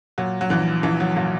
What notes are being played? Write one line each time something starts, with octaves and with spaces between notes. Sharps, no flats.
A#2 F#3
F#3
A#1 E3
A#1 E3
F#3
A#2 F#3